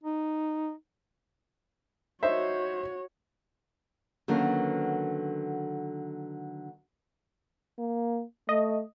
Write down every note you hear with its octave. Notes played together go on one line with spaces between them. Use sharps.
D#4
D#4 F#4 C5 C#5 E5
D3 D#3 F#3 A#3 B3 C#4
A#3
A3 D#5